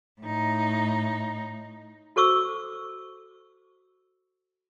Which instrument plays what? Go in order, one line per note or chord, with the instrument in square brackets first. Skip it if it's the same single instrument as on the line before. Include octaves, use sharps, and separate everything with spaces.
[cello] A2 D#4
[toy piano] F#4 A4 C5 C#6 D6 E6